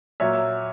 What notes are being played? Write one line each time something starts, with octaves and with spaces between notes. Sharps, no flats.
A#2 F#3 C#5 E5